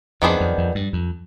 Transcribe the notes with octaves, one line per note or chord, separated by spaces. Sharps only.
F2 D#3 B3 D4 G#4 C5
F2
F2
G2
F2